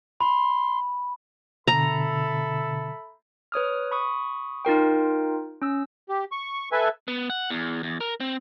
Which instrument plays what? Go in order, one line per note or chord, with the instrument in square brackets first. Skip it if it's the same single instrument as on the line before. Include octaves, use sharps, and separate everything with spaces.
[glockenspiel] B5 [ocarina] C6
[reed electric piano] B2 D3 [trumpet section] A4 E5 B5 [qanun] A#5
[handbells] B4 C#5 D#6 F6
B5 C#6 D#6
D#4 F4 A#4 G5
C#4 E6
[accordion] G4
C#6
A4 B4 E5 G#5
[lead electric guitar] B3
F#5
E2
E2
A#4
C4